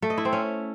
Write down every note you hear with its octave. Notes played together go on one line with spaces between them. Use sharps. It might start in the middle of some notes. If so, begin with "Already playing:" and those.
A3
D#5
E4
C4
C#4